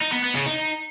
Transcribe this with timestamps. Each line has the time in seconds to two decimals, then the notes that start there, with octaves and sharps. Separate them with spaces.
0.02 D#4
0.13 B3
0.24 B3
0.35 C#3
0.46 D#4